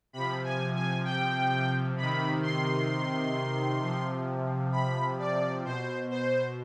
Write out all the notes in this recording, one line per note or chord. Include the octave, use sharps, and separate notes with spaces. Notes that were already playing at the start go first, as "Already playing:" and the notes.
C3 F3 B5
G#5
G#5
G5
C3 D#3 B5
C6
C3 F3
B5
D5
B2 C5
C5